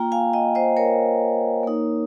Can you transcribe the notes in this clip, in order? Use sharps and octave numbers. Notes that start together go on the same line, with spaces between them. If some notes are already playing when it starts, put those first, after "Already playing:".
Already playing: A#3 F4 G5 A#5
F5 G#5
D#5 G5
C5 D#5
A#4 C#5
A#3 D#4